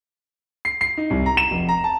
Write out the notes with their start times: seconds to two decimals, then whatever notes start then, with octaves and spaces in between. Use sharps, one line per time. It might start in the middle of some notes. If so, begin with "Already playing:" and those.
0.65 C7
0.81 C7
0.97 D#4
1.10 C2
1.26 A#5
1.37 E7
1.51 F1
1.69 A#5
1.84 A5